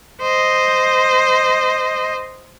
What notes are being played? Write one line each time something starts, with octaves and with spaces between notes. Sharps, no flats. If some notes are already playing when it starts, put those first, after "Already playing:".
C5 D#5